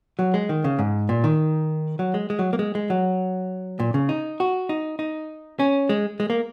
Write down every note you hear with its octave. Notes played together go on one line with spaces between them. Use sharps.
F#3
G#3
D#3
C#3
G#2
A#2
D#3
F#3
G#3
G#3
F#3
A#3
G#3
G#3
F#3
A#2
C#3
D#4
F#4
D#4
D#4
C#4
G#3
G#3
A#3